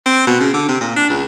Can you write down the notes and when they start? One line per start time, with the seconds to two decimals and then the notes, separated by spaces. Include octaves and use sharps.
0.06 C4
0.27 B2
0.40 C#3
0.54 D3
0.69 C3
0.81 A#2
0.96 D4
1.10 C#2